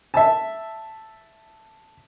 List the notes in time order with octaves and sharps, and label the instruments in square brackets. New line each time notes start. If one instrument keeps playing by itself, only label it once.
[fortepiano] E5 A5